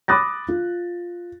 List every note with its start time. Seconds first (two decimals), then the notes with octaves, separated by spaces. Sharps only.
0.08 B5 D6 D#6 F#6 A6 A#6
0.48 F4